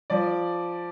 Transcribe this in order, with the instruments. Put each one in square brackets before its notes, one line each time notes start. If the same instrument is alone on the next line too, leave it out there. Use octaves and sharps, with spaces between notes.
[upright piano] F3 D5